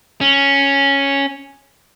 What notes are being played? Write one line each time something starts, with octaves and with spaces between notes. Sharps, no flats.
C#4